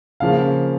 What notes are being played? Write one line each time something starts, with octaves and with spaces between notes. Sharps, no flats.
C#3 F3 A#3 F5